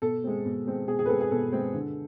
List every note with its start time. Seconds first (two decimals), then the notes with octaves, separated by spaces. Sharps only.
0.02 B2 A4
0.24 G#3 C4
0.45 B2
0.67 G#3 C4
0.88 B2 G#4
0.99 G#4
1.06 B4
1.09 G#3 C4 A4
1.20 G#4
1.31 B2 A4
1.53 G#3 C4
1.74 D3